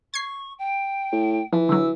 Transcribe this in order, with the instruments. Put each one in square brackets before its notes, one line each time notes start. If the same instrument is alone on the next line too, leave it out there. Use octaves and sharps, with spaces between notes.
[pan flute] C#6 [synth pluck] G#6 C7
[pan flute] G5
[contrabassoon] A2
[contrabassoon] E3 [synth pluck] F3
[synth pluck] D3 F#3 [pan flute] E6